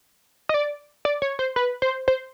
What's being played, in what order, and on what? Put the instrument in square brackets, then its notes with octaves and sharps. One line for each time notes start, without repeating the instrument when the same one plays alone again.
[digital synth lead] D#5
D5
D5
C#5
C5
B4
C5
C5